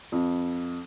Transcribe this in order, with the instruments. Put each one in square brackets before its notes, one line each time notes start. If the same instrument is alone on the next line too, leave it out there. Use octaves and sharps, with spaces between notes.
[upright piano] F2